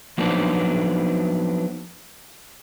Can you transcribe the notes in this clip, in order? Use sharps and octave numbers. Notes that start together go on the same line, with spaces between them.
F3 F#3 A#3 B3 D4 D#4